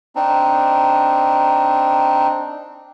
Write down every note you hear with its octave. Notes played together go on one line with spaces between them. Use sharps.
C4 D4 D#4